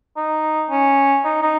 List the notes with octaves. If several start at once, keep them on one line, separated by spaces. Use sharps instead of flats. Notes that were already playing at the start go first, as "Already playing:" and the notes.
D#4
C#4
D#4
D#4